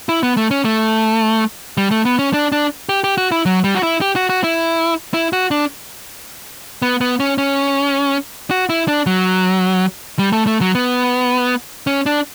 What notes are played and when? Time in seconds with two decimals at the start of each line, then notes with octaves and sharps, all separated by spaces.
0.09 E4
0.23 B3
0.37 A3
0.51 C#4
0.65 A3
1.77 G3
1.91 A3
2.05 B3
2.19 C#4
2.34 D4
2.52 D4
2.89 G4
3.04 G4
3.18 F#4
3.32 E4
3.46 F#3
3.64 G3
3.75 F#4
3.83 E4
4.01 G4
4.16 F#4
4.29 F#4
4.44 E4
5.14 E4
5.33 F#4
5.51 D4
6.82 B3
7.01 B3
7.20 C#4
7.38 C#4
8.51 F#4
8.69 E4
8.88 D4
9.06 F#3
10.19 G3
10.32 A3
10.47 A3
10.61 F#3
10.75 B3
11.87 C#4
12.06 D4